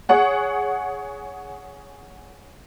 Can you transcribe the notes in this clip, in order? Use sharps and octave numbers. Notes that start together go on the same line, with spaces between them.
G#4 C#5 F#5